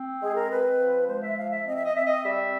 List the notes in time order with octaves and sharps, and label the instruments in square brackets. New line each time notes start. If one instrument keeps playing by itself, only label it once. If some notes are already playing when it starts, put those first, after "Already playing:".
Already playing: [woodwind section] C4
G#3 G#4
A#4
C4 B4
F3
G#3 C5
E5
F3 F5
E5
C4 D#5
E5
D#5
C4 E5
D#5
G3 E5